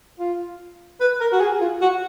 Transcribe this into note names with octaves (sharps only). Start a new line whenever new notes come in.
F4
B4
A#4
F#4
G#4
F4
F#4